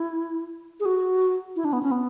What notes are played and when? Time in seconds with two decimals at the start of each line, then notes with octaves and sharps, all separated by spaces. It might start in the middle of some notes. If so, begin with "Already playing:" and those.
Already playing: E4
0.80 G#4
0.85 F#4
1.56 E4
1.65 D4
1.73 B3
1.83 C#4
1.91 B3